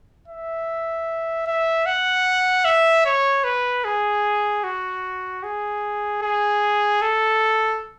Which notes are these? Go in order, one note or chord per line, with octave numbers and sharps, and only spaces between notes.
E5
E5
F#5
E5
C#5
B4
G#4
F#4
G#4
G#4
A4